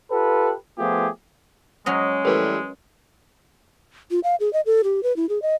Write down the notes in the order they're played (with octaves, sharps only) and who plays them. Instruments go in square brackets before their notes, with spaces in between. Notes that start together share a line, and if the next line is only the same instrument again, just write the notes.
[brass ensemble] F4 G4 A4 B4
F3 A3 B3 F4 G4 G#4
[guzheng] F#3 C#4 D#5 [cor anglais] G#3
[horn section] E3 G3 A3 [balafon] A#4 B4
[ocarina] F4
F5
G#4
D#5
A4
G4
B4
E4
G#4
D#5